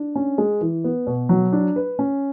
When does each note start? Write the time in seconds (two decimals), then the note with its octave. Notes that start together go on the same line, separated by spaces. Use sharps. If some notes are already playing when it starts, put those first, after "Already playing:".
Already playing: D4
0.16 C#4
0.38 G#3
0.61 E3
0.84 B3
1.07 B2
1.29 F#3
1.52 D4
1.76 B4
1.99 C#4